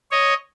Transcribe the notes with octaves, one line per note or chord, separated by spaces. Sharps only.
C#5 D#5